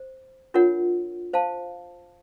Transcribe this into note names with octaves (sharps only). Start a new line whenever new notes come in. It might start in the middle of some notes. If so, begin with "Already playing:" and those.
Already playing: C5
D4 F4 A#4 C#5 F#5
C5 F5 A5